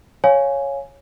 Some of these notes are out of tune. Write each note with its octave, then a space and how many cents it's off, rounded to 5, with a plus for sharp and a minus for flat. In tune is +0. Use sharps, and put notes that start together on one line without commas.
C#5 +0 F5 +0 G#5 +0